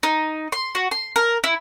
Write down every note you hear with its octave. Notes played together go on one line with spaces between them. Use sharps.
D#4
C6
F#4
C6
A#4
E4